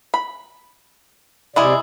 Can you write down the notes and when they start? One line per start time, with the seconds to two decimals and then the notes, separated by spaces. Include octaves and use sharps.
0.14 B5
1.56 C3 G#3 E4 G#4 D5